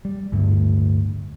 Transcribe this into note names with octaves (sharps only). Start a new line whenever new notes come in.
G3
D1 G2 D3 A3